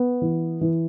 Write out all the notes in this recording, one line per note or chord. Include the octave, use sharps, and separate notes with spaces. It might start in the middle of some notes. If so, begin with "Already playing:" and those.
Already playing: B3
E3
E3